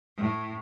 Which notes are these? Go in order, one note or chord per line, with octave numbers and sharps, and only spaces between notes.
A2